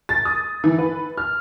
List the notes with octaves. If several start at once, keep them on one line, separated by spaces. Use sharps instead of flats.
A6
D#6
E3
B4
F6